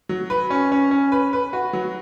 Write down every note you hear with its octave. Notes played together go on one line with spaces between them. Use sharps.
F#3
B4
C#4
C#4
C#4
B4
B4
F#4
F#3